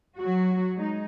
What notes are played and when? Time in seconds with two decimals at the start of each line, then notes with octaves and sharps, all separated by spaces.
0.19 F#3 F#4
0.76 G#3 D#4